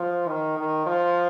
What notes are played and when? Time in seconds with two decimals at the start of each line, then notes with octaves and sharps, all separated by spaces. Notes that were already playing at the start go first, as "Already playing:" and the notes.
Already playing: F3
0.27 D#3
0.57 D#3
0.86 F3